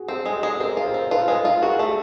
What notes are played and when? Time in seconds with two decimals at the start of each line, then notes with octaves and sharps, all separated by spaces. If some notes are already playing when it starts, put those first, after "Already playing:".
Already playing: F#4 G#4
0.08 C4 G4 A4
0.26 G#3
0.34 G4 A4
0.43 G#3
0.60 C4 G#4 A#4
0.77 F4
0.85 A#4 C5
0.94 C4
1.11 F4 A4 B4
1.28 G#3
1.45 F4
1.61 F#4 G#4 A#4
1.79 A3
1.87 G4 A4